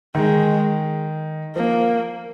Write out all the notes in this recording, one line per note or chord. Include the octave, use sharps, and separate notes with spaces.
D#3 G#3
F3 A#3